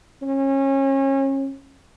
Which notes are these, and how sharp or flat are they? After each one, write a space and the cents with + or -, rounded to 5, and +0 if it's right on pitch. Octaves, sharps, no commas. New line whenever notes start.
C#4 -30